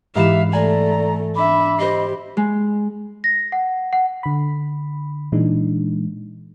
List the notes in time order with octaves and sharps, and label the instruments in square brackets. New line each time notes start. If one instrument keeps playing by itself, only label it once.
[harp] G#2 E3 E7 [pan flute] G4 [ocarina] E5 [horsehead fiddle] F5
[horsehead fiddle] A3 [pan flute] D5 [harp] G#5 [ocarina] A#5
[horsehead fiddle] D4 E5 [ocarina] B5 [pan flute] D6
[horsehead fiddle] G4 [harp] C5 C7 [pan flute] D#5
[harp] G#3
[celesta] A#6
F#5
F#5
[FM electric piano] D3 B5
A#2 E3 G#3 D4 D#4